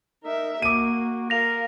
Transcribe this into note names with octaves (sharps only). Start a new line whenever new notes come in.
D#4 A#4 E5
A#3 F#4 D6 D#7
A#4 F5 A#6 F7